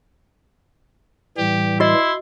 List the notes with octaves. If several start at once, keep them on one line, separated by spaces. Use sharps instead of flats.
A2 E3 G3 G4
E4 F#4 D#5 C6